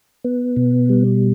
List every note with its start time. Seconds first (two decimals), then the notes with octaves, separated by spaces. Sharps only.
0.25 B3
0.57 B2
0.89 G3